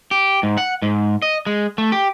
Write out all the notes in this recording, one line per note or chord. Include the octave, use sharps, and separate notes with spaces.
G4
G#2
F#5
G#2
D#5
G#3
A3
G4